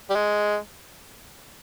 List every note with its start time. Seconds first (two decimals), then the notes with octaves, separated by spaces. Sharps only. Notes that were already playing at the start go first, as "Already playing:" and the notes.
0.10 G3
0.15 G#3